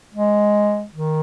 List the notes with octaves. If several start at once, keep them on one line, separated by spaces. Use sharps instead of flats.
G#3
D#3